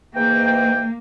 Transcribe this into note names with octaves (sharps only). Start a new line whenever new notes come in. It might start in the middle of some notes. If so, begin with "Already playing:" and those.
G#2 E3 A#3 G5